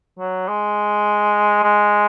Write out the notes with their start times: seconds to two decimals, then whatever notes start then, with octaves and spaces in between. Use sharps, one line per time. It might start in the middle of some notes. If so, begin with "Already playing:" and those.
0.19 F#3
0.48 G#3
1.63 G#3